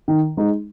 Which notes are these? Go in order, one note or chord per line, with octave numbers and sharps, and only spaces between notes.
D#3
G#3 D#4